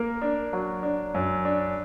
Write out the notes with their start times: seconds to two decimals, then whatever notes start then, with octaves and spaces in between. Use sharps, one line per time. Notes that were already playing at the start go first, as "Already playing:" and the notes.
Already playing: A#3 A#4
0.22 D4
0.53 F#3
0.83 D4
1.14 F#2
1.45 D4